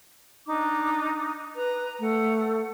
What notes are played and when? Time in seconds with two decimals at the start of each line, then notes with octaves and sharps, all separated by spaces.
0.47 D4 D#4 D6
1.56 B4 A#5
2.00 A3 F#5